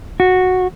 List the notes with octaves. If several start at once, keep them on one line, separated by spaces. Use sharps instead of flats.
F#4